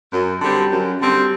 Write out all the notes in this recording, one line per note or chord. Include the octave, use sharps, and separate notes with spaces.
F#2
D3 G3 C4
F#2
D3 G3 C4